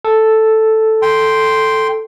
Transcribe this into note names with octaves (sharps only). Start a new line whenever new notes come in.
A4
G5 C6